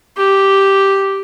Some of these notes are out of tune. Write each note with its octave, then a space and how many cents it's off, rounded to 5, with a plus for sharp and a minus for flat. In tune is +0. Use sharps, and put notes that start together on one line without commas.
G4 -5